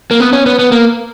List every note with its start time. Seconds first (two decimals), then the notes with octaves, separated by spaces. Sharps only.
0.11 A#3
0.20 B3
0.33 C#4
0.46 B3
0.59 B3
0.72 A#3